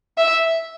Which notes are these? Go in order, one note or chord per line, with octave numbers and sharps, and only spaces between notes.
E5